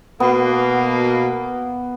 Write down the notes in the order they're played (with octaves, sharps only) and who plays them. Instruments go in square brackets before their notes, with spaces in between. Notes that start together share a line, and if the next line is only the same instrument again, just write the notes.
[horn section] B2 A#3 [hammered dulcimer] B3